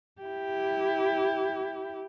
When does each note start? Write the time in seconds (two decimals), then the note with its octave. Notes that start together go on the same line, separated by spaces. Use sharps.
0.22 E4 G4